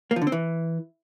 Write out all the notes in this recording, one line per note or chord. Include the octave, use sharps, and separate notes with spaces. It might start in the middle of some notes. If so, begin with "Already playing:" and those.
A#3
F3
D3
C4
E3